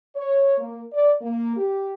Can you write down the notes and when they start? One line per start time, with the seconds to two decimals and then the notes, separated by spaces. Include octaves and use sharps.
0.16 C#5
0.58 A#3
0.93 D5
1.22 A#3
1.57 G4